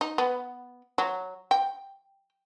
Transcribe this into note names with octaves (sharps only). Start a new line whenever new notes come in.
D#4
B3
F#3
G5